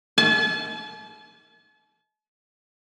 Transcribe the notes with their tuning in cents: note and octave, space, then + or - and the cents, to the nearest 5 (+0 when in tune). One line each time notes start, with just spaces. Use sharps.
A5 -45